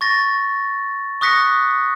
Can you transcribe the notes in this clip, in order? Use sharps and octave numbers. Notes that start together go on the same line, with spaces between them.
C#6 A6 A#6
C#6 D#6 F#6 A#6 B6 C#7